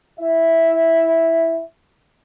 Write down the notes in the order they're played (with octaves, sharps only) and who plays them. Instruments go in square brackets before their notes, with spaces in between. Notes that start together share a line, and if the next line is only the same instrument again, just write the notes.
[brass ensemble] E4 E5